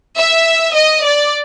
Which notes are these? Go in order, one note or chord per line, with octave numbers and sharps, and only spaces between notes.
E5
D#5
D5